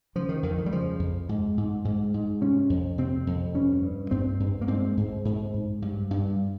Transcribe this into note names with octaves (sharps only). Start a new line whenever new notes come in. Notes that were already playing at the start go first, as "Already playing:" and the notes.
C#3 F3
D#3
F2 D#3
D#3
G3
C#3 F3
F2
G#2
G#2
G#2
G#2
C3 C#4
F2
C3 C4
F2
G2 C#4
G2
G2 C4
G2
A#3
G#2 C4
G#2
G#2
G#2
G2
G2